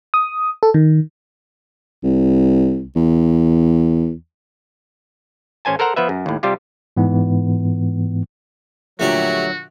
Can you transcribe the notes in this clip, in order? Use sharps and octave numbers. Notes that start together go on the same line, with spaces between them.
D#6
A4
D#3
C2
E2
A1 C#4 C5 G#5 A5
A4 A#4 C5 F#5 A#5
F3 B3 B4 E5
F#2
D#2 A2
C3 G3 F4 G4
G#2 E3 B3
A#2 D3 F3 F#3 A3 F#4 G4 D5